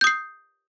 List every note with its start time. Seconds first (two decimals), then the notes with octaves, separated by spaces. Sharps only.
0.01 G6
0.04 D#6
0.07 C7